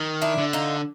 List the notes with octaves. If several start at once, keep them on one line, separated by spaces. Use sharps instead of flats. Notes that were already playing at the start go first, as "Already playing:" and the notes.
Already playing: D#3
D4 E4
D3
D#4 F4